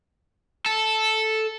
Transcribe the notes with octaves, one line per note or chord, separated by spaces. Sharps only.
A4